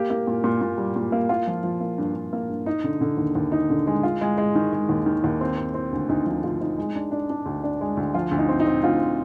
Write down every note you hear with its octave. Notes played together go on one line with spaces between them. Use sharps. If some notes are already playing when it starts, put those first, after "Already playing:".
Already playing: A#3 G4
A#3
A#2
A#2
A#2
G3
A#2
A#3
A#3 F4
F3
F3
A#3
G2
G2
A#3
G2
D#4
D3
D3
D#2
D#2
D#4
D3
G#3
G#3 F4
G#3
G#3
D#3
G#3
D#2
D#3
D#2
C4
C4
C4
D2
D2 D#4
F3 D#4
D2 F4
C4 D#4
G#3
D4
D4
D4
D2
D4
G#3
D2
F3 F4
D2
D#4
C4
D#4
C4
D2 F4